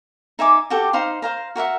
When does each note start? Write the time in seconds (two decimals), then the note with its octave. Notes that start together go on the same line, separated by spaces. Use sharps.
0.39 D#4 E5 G#5 D6
0.70 F#4 G4 A4
0.93 D#4 C5 F5 C6
1.22 C5 F5 A#5
1.56 F#4 A#4 E5 F#5